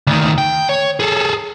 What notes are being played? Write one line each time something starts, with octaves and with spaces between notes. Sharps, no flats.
D2 D#3
G5
C#5
G#4 A4